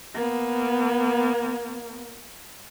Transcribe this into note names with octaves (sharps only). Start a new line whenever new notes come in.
A#3 B3